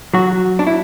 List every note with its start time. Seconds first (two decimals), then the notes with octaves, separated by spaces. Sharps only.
0.14 F#3 F#4
0.59 D4
0.67 E4